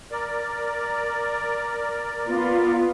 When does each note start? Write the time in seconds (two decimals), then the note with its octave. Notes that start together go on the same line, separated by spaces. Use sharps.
0.11 A#4 D5
2.29 B3 F4